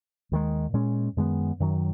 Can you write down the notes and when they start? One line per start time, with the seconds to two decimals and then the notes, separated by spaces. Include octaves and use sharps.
0.32 D#2 D#3 G#3
0.73 A#2 G#3 C#4
1.16 F#2 D#3 G#3 B3
1.60 F#2 D#3 F#3